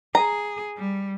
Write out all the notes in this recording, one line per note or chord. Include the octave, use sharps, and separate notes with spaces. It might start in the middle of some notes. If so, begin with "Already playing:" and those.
G#4 A#5
G3